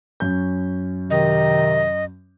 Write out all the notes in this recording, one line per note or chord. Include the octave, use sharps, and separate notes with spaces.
F#2 C#4 G6
C3 D#3 D#5